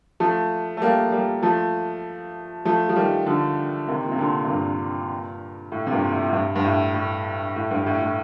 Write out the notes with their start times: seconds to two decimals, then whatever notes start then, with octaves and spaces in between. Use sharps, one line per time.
0.20 F3 A3
0.77 A3
0.81 G3 A#3
1.12 G3 A#3
1.43 F3 A3
2.65 F3 A3
2.89 F3
2.96 D#3 G3
3.26 D3 F3
3.88 C3 D#3
4.04 A#2
4.12 C3
4.18 A#2 D3
4.44 C3
4.50 G2 A#2
5.72 A2
5.87 C3
5.92 G2 A#2
6.12 A2
6.29 A2
6.33 G2
6.56 G2
6.64 A2
6.94 A2
7.56 A2
7.71 G2
7.86 A2
8.02 A2